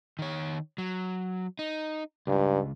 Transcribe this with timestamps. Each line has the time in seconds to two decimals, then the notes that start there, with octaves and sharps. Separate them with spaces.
0.19 D#3 C#5
0.78 F#3
1.59 D#4
2.27 C#2 G2